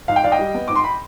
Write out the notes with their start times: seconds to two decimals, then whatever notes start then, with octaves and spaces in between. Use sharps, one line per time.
0.08 G#2 F5
0.16 G5
0.24 G#2 D5 F5
0.32 D#5 G5
0.39 G3
0.54 B3
0.68 G#2 D6
0.76 C6
0.84 B5